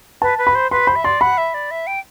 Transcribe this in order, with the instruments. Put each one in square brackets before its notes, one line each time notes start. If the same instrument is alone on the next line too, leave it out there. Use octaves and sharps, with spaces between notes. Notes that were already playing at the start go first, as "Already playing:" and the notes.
[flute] B4 [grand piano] A5
[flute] B4
[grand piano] B5
[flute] C5
[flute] B4 [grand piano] C6
[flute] C5 [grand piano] B5
[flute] E5
[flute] D5 [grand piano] C6
[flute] F#5 [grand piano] B5
[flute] E5
D5
E5
G5